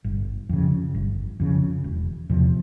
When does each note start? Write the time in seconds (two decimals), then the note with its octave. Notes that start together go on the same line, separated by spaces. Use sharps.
0.04 G1
0.49 F2 C#3
0.95 G1
1.40 F2 C#3
1.84 E1
2.29 E2 C3 F3